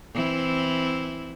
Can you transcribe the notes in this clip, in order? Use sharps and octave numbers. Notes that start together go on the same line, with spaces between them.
E3 C4 E4